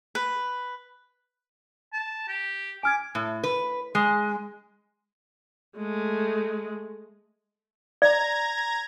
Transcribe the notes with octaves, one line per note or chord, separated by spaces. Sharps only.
B4
A5
G4
G#5 D6 F6 G#6
A2
B4
G#3
G#3 A3
D5 A#5 G#6 A#6